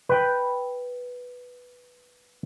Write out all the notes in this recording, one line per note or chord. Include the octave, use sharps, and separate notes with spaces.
B4 G5